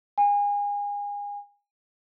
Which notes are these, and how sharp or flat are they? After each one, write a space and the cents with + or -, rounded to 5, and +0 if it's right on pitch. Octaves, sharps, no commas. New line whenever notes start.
G#5 -30